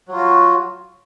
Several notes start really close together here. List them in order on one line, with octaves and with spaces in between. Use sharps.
F#3 F4 F#4